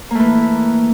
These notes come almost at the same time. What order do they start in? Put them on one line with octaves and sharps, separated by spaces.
A#3 A3 E3